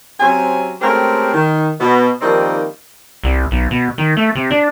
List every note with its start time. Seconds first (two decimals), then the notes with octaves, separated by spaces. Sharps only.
0.19 C3 F#3 C4 C#4 G#5
0.81 G#3 A3 C4 C#4 G4 A#4
1.33 D#3
1.80 B2
2.21 D#3 F3 G3 A#3 C4 D#4
3.24 C2
3.51 B1
3.71 B2
3.98 D#3
4.17 A3
4.35 C3
4.51 D4